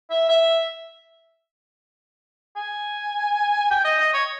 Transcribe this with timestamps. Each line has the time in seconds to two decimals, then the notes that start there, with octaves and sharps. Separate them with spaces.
0.10 E5
0.29 E5
2.56 G#5
3.71 G5
3.85 D#5
3.98 D#5
4.14 C#5